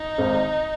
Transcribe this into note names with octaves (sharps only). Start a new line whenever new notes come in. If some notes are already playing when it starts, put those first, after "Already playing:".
Already playing: D#4
G#1